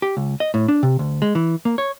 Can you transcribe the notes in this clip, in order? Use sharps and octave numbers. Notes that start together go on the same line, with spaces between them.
G4
C#2
D#5
A2
D4
C3
D2
G#3
E3
A#3
C#5